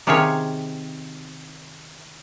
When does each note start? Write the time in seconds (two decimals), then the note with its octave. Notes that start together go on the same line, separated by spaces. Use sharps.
0.07 C3 D#3 C#4 F4 G#4 C#5